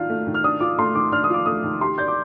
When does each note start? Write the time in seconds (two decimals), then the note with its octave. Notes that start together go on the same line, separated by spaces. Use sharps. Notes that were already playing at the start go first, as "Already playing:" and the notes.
Already playing: D#3 D4 F4 F6
0.09 A3
0.27 D#3
0.34 F6
0.44 D4 D#6
0.61 F4 D6
0.78 A3 C6
0.95 D#3 D6
1.12 D4 F6
1.24 D#6
1.30 F4 D6
1.46 A3 D#6
1.64 D#3
1.81 G4 C6
1.98 D5 G6
2.08 D6